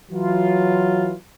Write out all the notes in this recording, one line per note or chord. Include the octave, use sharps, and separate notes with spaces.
E3 F#3 F4